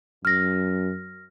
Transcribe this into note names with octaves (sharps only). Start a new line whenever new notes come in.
F#2 F6 A#6